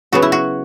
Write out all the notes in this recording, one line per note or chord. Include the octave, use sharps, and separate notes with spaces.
C#3 F#3 B3 F#4
E4
F#4